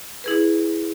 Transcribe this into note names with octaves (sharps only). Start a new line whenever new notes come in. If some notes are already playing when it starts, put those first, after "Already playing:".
E4 G#4 B4